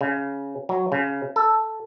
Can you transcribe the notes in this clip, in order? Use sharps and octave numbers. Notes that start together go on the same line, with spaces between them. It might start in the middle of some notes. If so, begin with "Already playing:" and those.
C#3
F#3
C#3
A4